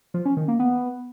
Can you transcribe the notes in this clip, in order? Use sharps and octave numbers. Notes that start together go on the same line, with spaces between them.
F3
C#4
D#3
A#3
B3